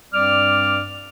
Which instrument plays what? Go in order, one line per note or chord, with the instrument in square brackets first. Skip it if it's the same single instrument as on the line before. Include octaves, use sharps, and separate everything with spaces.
[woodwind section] G2 G3 C4 D5 D6 F6